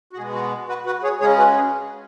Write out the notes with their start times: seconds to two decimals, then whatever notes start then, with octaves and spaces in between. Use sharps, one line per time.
0.13 F#4
0.17 B2 G#3 B3 G#4
0.34 F#4
0.68 F#4 B4
0.86 F#4 B4
1.03 G#4 C#5
1.20 C#3 G#3 C#4 G#4 C#5
1.38 F#4 B4
1.55 G#4